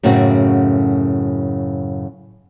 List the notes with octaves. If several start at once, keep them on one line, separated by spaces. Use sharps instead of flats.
F#2 A2 C#3 C4 F#4